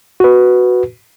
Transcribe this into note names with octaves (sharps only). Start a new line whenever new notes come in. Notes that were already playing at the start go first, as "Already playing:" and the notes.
F#4 B4